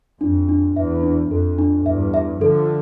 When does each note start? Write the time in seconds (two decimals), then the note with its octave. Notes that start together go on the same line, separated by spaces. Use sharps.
0.21 F2 D4
0.49 D4
0.76 E2 E5
1.03 D4
1.31 F2 A4
1.58 D4
1.86 E2 G2 E5
2.14 E5
2.41 D3 F3 A4